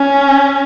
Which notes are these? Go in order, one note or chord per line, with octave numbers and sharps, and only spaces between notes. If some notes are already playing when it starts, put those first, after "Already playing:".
Already playing: C#4